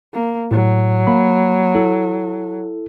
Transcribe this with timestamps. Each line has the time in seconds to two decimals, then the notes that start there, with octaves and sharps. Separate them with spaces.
0.14 A#3
0.51 A2 F#3
1.07 A#3 B5
1.75 E4 A4